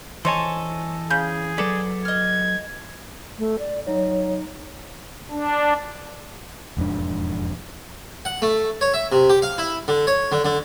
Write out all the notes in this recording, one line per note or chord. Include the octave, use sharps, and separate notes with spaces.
E3 A4 C5 C#5 D#5 G#5 A5
C#3 G#4 G6
F#3 A4 B4 D5
D#5 F6 G#6
A3
D5
F#3 D#4 C#5
D4
E1 F2 G#2 D4
F#5
A3
C#5
E5
C3
G4
F5
E4
D3
C#5
D3
D3